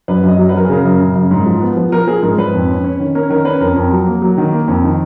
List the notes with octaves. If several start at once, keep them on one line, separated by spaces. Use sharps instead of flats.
F#2 B4
F#2 D#5
F#3
B4
F#3 A#4
G#4
C#3 A#4
F#2
C#3
F#2
G#2
F3
B3
F3
F3 A#4
F3 G#4
G#2 A#4
G#2 B4
F2
C#4
C#4
D#3
C#4 A#4
D#3 A#4
C#4 B4
F2 A#4
F2
F#3
A#3
F#3
D#3
A#3
F2
D#3